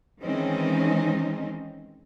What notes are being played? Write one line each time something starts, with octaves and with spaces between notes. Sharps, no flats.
D#3 E3 G#3 C4 C#4 D#4